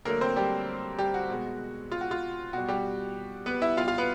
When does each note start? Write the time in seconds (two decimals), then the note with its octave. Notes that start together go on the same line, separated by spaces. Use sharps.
0.05 D3 F#3 A3 A#3 A#4
0.21 C4 C5
0.36 G3 G4
0.99 G3 G4
1.14 F#4
1.30 B2 G#3
1.92 F4
2.01 F#4
2.11 F4
2.53 B2 G3 F#4
2.68 G3 G4
3.46 B3 B4
3.62 E4 E5
3.77 B2 G3 F4 F5
3.88 F4 F5
3.98 B3 B4